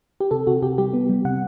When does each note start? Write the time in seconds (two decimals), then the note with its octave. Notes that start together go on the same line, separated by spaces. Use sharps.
0.20 G4
0.31 C3 A4
0.47 C3 F#4
0.62 C3 G4
0.78 G3 G4
0.93 B3
1.09 G3
1.25 C3 F#5